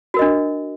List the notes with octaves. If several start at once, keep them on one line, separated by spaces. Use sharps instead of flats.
D4 F#4 A#4 D#5